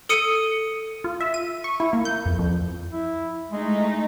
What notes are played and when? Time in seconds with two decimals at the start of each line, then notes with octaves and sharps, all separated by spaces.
0.09 A4 D#6 C#7 D#7
1.04 F4
1.20 E5
1.34 D#7
1.64 C#6
1.80 E4
1.93 A#3
2.05 G6
2.25 F2
2.39 F2
2.91 E4
3.51 G#3 A3 D#4